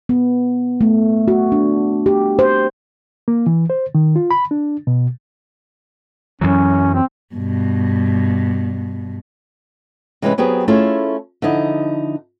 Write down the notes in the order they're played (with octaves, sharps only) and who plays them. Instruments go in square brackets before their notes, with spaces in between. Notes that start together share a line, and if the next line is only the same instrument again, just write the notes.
[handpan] B3
A3
F#4
D4
G4
C5
[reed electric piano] A#3
E3
C5
D#3
F4
B5
D4
B2
[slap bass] F#2 E3 F#3 [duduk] C#4
[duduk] C4
[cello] G2 B2
[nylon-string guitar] C3 E3 G#3 C#4 F4 B4
F#3 B3 C4 G4 G#4
A3 C#4 E4 F4 G#4 A4
D3 F3 D#4 E4 D#5